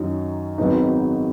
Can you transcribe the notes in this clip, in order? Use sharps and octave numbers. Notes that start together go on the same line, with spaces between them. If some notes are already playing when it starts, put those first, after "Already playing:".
Already playing: F#2 D#3 F#3 D#4
G#1 G#2 F#3 B3 D#4